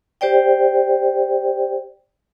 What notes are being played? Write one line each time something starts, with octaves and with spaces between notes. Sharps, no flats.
G4 C5 D5 G5